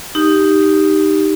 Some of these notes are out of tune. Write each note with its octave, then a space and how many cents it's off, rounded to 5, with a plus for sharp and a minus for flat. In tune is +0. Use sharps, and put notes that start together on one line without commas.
D#4 +0 G4 +0